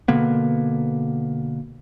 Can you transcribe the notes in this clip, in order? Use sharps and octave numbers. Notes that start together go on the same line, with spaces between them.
B2 D3 A#3 B3